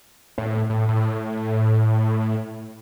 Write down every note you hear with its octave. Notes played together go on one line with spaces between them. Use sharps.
A2
A2
A2